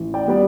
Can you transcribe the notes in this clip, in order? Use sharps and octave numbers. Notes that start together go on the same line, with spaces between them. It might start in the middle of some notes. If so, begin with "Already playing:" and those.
Already playing: A1
D5 G5
G3 B3 D5